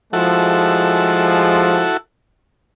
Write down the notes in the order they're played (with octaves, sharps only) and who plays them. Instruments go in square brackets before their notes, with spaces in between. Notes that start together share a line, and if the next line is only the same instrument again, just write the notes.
[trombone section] F3 G#3 [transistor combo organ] E4 F#4 A4